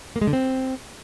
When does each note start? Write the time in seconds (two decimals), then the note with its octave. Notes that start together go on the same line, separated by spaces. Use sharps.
0.16 A#3
0.21 G#3
0.27 D3
0.33 C4